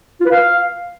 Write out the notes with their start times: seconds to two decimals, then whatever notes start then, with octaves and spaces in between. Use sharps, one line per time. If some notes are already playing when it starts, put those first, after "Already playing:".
0.20 F4
0.25 B4
0.31 F5